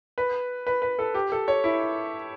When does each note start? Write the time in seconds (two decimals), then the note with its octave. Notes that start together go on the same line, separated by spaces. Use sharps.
0.18 B4
0.67 B4
0.82 B4
0.99 A4
1.14 G4
1.32 A4
1.48 C#5
1.64 E4